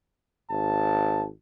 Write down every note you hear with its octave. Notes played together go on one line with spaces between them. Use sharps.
G#1 A5